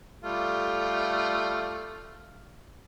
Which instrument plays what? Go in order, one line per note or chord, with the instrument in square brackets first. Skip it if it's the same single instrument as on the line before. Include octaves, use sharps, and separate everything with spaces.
[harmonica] G3 A3 F4